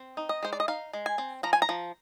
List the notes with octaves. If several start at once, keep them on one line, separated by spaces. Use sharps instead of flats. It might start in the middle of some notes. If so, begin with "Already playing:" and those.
Already playing: C4
D#4
D#5
G#3 C5
D5
D#5
D#4 F5
G#3
G#5
C4
F3 A#5
G#5
A#5
F3